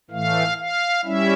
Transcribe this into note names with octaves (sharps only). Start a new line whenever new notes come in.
A2 E3 A3 F5
F5
G3 C#4 E4 E5